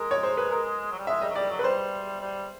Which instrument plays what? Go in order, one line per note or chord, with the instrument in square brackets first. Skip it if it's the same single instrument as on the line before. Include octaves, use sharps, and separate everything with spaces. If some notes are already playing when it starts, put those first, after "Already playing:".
Already playing: [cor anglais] G#3 [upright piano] A#4
[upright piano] C#5
C5
B4
A#4
[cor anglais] F#3
G3
[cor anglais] G#3 [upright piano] E5
[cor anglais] G3 [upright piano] D#5
[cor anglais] F#3
[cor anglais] G3 [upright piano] D5
[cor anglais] F#3
[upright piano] B4
[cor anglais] G3 [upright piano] C5
[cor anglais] G3